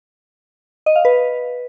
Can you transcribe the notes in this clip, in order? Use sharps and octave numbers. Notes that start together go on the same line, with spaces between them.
D#5
F5
B4